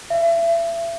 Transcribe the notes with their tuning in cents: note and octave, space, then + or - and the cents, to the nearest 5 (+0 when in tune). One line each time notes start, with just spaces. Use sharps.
E5 +35